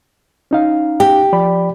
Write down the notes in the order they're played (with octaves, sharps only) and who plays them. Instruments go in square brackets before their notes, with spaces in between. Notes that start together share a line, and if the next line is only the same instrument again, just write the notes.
[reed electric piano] C#4 D#4 F5
[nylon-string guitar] G4
[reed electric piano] F3 D5 B5